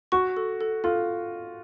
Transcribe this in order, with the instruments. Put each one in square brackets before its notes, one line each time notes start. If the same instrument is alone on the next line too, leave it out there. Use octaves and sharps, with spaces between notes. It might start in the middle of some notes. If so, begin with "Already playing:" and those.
[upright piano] F#4 [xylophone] C#6
[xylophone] A4
A4
[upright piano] F4 [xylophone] A4